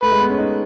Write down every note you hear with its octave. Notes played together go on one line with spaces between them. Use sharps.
A3 B4
G#3
B3
C#4
D#4